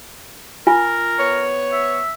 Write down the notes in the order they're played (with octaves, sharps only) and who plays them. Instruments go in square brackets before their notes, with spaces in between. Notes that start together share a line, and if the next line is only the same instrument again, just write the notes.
[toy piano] F4 G#5 [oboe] A#4
[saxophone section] B3 C#5
[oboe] E5